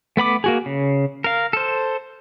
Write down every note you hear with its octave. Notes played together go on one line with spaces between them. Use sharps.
A3 B3 B5 D6
A#3 F#4 G#4
C#3
A#4 F5
A4 C5